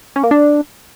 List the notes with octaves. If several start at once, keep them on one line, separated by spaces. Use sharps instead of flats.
C#4
A#3
D4